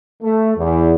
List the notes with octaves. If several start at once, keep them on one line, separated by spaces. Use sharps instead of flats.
A3
E2